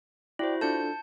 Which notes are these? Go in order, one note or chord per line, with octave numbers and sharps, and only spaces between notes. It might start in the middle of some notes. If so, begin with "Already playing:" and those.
E4 F#4 C5 D5 G5
D4 F4 A4 A5 G6 C#7